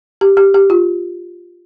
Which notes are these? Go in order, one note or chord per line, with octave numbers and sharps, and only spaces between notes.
G4
G4
G4
F4